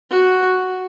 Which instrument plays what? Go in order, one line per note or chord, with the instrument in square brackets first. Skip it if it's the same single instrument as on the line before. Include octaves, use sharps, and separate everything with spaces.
[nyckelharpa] F#4